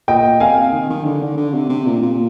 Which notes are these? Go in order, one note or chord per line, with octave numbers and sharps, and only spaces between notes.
A#2 D#5 G5
C3 F5 G#5
D#3
D#3
D3
D3
D3
C3
C3
A#2
A#2